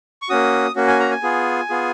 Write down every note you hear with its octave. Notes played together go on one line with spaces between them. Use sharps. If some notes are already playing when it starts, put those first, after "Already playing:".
C#6
A#3 C#4 F#4 D#6
A#3 C#4 F#4
G#5
A#5
G#5
B3 F4 G#4
B3 F4 G#4